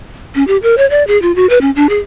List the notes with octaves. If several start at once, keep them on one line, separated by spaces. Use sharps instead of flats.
C#4
G4
A#4
C#5
D5
G#4
F4
F#4
B4
C#4
D4
G#4